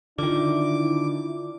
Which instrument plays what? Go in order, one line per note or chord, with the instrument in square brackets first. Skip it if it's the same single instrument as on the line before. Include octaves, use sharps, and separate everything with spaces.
[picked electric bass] D3 D#3 [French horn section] D4 E4 [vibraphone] F4 [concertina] D6